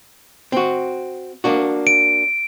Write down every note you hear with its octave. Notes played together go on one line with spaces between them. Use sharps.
C4 F#4
A#3 D4 F#4
D7